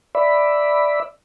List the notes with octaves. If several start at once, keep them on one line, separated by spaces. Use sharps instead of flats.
D5 E5 B5